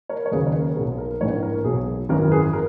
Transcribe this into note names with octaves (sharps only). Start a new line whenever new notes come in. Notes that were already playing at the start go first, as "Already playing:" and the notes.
A#4 C#5
C#5
D#2 C#3 F#3 G#4 B4
A#4 C#5
A#4
B1 B2 F#3 G#4
A#4
A#1 G#2 E3 A#4 C#5
A#4
B1 B2 F#3 G#4
G#1 F#2 E3 A#4
G#4 B4
A#4